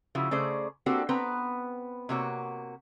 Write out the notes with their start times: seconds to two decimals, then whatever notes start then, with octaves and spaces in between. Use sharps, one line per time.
0.15 C#3 F3 E4 F#4
0.31 C#3 A3 G#4 C5 D5
0.86 A#3 C4 D4 F#4 G4 A4
1.09 B3 C4 B4 A#5
2.09 C3 A#3 F#4 C#5